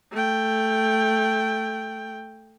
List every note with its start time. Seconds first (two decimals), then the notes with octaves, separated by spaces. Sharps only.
0.12 A3 G5